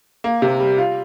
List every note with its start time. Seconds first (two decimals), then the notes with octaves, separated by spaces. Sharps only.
0.24 A#3
0.42 C3
0.60 G3
0.78 F4